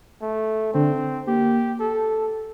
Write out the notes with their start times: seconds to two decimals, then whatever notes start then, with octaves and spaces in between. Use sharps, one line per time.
0.22 A3
0.74 D3 C4
1.27 A#3 G4
1.80 A4